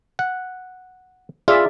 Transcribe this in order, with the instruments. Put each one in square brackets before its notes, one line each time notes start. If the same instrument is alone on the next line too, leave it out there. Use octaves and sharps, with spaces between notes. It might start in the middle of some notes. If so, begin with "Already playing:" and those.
[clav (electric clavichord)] F#5
[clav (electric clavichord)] F4 [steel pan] G#4 D5 E5